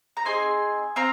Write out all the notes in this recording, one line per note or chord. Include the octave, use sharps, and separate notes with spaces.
A#5
C4 D#4 G#4 G#5 C6
C4 F5 A#5